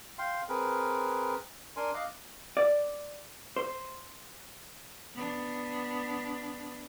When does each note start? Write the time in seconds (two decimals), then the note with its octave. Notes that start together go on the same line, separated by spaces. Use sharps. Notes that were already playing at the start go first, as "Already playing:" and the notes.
0.19 F5 G5 C6
0.49 C4 G#4 A#4 B4
1.76 D4 A#4 G#5 C6
1.94 D#5 F5 D6 F#6
2.57 D5
3.56 C5
5.15 B3 D4